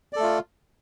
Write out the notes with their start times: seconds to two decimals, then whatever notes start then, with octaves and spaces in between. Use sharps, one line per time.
0.13 D5
0.16 A4
0.19 A3
0.23 F4